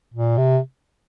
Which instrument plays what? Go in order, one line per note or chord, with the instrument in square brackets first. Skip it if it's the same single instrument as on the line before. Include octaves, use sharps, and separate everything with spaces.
[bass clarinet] A#2
C3